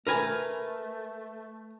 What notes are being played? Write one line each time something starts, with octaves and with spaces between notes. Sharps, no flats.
A3 A#4 B4 G#5